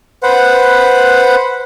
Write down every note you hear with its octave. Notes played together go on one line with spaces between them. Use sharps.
B4 C5 F#5